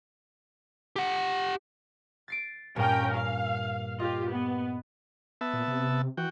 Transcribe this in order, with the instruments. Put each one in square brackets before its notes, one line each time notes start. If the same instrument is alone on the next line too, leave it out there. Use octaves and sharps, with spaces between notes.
[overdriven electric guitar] G4 F#5
[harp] A6 C7 D7
[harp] G2 A#2 [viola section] C#4 A#4 G5
[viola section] F5
[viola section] F4 G4 [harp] D#5
[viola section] B3
[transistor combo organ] B3 E5 A5
[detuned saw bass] A#2
C3
[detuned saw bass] E3 [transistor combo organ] F#4 G5